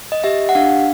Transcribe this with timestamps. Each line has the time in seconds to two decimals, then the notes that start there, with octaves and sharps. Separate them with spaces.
0.12 D#5
0.24 G4 E5
0.49 F#5
0.55 D4 F5